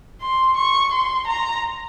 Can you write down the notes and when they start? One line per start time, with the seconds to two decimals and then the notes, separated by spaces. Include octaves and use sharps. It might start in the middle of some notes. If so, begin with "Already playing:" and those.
0.22 C6
0.57 C#6
0.92 C6
1.27 A#5